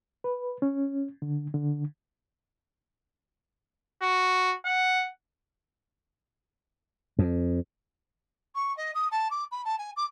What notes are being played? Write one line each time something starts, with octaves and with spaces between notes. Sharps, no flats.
B4
C#4
D3
D3
F#4
F#5
F2
C#6
D#5
D#6
A5
D6
B5
A5
G#5
D6